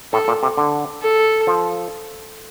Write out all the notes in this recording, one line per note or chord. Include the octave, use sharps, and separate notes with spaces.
A2 A4
A#2
C3
D3
A4
F3